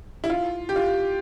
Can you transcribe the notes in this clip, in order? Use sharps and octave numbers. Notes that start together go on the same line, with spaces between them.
E4
F4
G4
F4